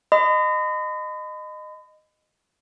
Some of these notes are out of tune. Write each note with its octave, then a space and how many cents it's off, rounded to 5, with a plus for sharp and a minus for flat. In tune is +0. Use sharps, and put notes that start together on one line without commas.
D#5 -20 B5 +40